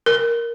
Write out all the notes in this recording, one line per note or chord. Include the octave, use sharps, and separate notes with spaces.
A#4